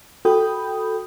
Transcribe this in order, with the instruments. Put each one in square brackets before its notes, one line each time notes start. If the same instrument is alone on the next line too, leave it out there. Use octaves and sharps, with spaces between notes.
[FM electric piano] F#4 A4 G5 B5 D#6 G6